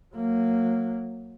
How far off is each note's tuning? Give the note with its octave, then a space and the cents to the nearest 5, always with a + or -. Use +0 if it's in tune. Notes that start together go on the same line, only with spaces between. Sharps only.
F#3 -20 A#3 -20